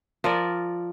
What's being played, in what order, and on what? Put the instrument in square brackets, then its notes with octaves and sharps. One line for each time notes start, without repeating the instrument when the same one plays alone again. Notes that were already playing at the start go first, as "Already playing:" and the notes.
[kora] F3 A#4 D5